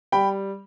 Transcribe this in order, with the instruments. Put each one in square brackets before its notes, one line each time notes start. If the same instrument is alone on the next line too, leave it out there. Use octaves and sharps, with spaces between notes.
[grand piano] G3 G5 B5